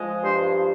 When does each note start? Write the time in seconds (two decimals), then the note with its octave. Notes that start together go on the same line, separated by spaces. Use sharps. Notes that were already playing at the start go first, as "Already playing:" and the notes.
Already playing: F3 G#3
0.23 G2 C5